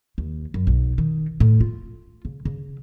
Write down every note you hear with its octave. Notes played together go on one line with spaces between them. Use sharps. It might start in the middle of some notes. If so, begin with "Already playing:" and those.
D#2
F#2
B1
D#3
A2
F4
C#3
C#3